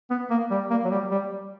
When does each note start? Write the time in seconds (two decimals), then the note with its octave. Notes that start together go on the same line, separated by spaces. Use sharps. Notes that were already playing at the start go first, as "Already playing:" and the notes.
0.10 B3
0.30 A#3
0.51 G3
0.70 A#3
0.85 F#3
0.91 G3
1.11 G3